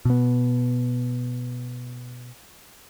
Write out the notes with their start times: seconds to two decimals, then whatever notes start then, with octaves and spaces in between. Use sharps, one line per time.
0.05 B2 B3